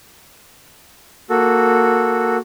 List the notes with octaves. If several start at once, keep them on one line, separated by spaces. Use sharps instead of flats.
A#3 F#4 A4